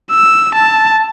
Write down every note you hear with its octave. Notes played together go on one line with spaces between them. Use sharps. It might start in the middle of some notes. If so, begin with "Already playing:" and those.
E6
A5